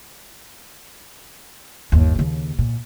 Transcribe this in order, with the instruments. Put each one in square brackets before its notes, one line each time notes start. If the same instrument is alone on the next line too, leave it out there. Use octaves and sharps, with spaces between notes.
[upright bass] G1 D#2
D#2 C#3
A#2